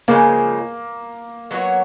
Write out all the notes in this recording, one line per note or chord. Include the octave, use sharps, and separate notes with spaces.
C#3 F3 G#3 A#3
F#3 B3 F#4 C#5